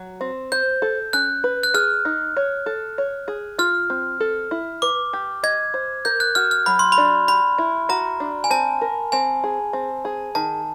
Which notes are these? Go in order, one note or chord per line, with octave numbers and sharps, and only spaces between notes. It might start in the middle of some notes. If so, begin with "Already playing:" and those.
Already playing: F#3
C4
C5 G6
A4
C#4 F#6
B4
F#6
G#4 F6
D#4
C#5
A4
C#5
G#4
F4 F6
C4
A4
E4
B4 D6
G4
D#5 G#6
C5
A#4 G6
F#6
F#4 F6
F6
F#3 B5
C6
B5
D4
G4 B5
E4
F#4 A#5
D4
G#5
C4 A5
A#4
C4 G#5
G#4
C4
G#4
D#3 A5